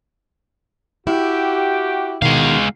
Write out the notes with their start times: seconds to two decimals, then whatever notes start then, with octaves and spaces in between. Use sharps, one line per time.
1.07 E4 F#4 G4
2.22 B2 D#3 G#3 F5